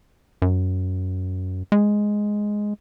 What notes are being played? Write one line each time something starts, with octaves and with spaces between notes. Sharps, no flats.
F#2
G#3